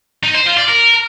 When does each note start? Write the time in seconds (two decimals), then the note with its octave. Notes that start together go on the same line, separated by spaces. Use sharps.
0.23 D#4
0.35 C5
0.46 F4
0.57 D5
0.69 A#4